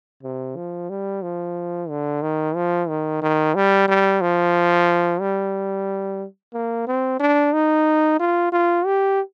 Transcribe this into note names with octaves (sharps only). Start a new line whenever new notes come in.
C3
F3
G3
F3
D3
D#3
F3
D#3
D#3
G3
G3
F3
G3
A#3
C4
D4
D#4
F4
F4
G4